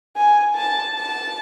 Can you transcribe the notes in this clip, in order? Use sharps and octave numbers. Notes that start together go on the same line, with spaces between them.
G#5
A5
A5